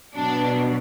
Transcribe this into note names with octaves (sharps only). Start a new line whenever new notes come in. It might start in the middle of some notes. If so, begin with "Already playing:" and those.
B2 F#3 D4